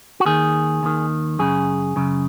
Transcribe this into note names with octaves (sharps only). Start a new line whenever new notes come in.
F#4
D#2 D#3 G#4
D#2 D#3
F#2 C#3 G#4
F#2 C#3